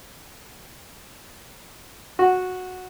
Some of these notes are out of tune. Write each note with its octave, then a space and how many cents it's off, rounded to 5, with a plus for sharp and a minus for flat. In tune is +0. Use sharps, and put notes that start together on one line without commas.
F#4 -10